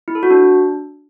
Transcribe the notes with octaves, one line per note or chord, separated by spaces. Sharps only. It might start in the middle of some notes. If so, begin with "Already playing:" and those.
E4
A4
F#4
D4